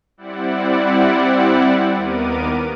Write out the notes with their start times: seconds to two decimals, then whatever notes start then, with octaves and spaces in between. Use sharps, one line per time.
0.17 G3 C4 E4 D5 F#5
1.94 D#2 B3 A#4 D6 D#7